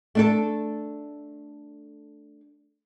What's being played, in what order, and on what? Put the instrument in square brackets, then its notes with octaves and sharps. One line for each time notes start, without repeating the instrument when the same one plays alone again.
[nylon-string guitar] A3 D4 A4